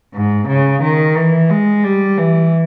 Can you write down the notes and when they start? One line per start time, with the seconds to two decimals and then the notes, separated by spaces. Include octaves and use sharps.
0.14 G#2
0.48 C#3
0.82 D#3
1.15 E3
1.50 G#3
1.84 G3
2.17 E3